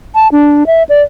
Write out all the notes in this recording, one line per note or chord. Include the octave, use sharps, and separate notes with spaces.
A5
D4
E5
D5